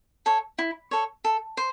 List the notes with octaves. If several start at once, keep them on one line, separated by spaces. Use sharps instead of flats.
A4 C#5
E4
A4 C#5
A4
C5